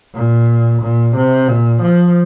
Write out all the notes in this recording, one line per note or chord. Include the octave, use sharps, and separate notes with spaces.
A#2
A#2
C3
A#2
F3